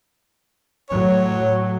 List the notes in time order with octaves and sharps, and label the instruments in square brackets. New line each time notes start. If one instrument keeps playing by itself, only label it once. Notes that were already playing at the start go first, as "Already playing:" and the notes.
[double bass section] A2 F#3 [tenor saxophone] C#5